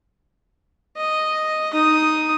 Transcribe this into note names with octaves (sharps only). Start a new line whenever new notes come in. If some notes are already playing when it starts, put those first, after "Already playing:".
D#5
D#4 D#6